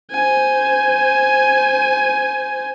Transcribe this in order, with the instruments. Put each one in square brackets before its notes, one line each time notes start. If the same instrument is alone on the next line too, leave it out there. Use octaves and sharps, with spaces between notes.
[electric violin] C5 G#5